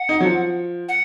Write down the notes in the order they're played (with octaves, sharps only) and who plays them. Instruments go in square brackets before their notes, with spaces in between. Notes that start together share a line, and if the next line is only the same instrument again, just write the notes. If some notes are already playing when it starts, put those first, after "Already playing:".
Already playing: [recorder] F#5
[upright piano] D#4
F#3
F3
[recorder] F#5